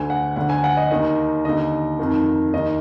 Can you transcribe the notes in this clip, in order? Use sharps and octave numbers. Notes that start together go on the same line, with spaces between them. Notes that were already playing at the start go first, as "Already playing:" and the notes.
Already playing: D2 D3 G#5
F#5
D2 D3 F#5
G#5
F#5
D#5
D#2 D#3 D#5
D#2 D3 D#5
F2 D#3
D#2 D#3 D#5